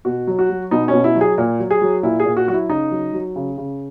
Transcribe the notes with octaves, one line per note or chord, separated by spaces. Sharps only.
B2 F#4
F#3
F#4
F#3
B2 D#4
C#4
B2
E4
F#3
G#4
A#2
F#3
G#4
F#3
A#2 E4
G#4
A#2
F#4
F#3 F#4
E4
C#3 D#4
F#3
F#3
C#3
C#3